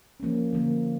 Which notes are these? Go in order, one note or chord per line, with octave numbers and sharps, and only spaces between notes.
F3 A#3 C#4
D3 F3 A#3